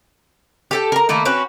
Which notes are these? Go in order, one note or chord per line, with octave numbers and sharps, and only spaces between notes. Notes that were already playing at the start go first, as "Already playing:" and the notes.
G4 A4 G5
A#4 A#5
D#3 A3 A#3 E4
C4 C#4 F#4 B4